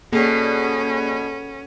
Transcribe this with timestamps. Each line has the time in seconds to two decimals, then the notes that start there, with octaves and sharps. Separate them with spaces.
0.13 B2 A#3 C#4 G#4 A4 D5